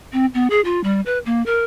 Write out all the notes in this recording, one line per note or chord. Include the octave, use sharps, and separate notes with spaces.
C4
B3
G#4
F4
G3
B4
A#3
A#4